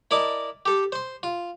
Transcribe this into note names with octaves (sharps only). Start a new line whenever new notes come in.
E4 A#4 D5 D#5 A5
G4 A4
C5 C6
F4